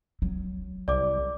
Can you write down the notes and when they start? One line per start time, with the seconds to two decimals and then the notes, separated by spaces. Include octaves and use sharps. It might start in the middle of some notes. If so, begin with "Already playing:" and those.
0.22 F#3
0.88 C2 D5 D6